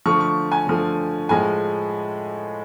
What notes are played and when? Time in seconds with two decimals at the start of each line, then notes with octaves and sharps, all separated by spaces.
0.06 D3 F3 A3 C#6
0.21 C#6
0.52 G#5
0.67 D3 F3 A3
1.29 A2 F3 G#3 G#5